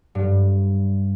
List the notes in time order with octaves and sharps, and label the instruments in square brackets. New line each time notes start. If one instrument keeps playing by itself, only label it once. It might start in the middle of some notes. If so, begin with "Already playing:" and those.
[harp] G2